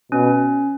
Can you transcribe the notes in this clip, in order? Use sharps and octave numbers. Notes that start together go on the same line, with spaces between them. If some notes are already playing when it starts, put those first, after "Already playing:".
B2 C#4